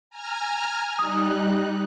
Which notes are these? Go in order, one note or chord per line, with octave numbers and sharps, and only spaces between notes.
G#5 A#5 F6
G3 D#4 D#6 F#6